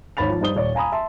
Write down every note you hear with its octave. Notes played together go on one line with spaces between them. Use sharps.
G#1 C#5 B5 A6 F7
F3
G2 D#4 C5 D#6 G7
D#1 C#5 D5
F5 G#5 A#5 B5 D#6
E5 A5 C6